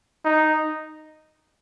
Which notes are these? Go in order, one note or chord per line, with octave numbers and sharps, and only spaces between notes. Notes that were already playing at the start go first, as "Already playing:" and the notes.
D#4